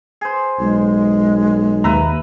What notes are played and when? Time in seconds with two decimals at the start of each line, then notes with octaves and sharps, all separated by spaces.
0.21 G#4 C5
0.60 B1 G#3
1.84 D#2 B4 E5 A#5